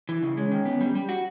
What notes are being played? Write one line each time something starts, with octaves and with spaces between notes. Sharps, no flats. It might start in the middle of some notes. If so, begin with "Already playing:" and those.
E3
C#3
G#3 C#4
D#3
B3
G3
G3
F#4